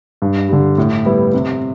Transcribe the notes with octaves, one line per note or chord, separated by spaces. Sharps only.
G2
D3 G3
A2
G3 B3 E4 B4
C3